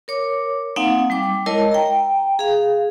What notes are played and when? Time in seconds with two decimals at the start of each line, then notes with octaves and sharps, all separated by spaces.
0.08 A#4 C#5 D6
0.76 A#3 C4 D#4 F5 F#5 G#5
1.10 G3 G5 D6
1.46 G#3 E4 A#4 C#5 D#5 A5
1.71 G5 A#5
2.39 G#4 F5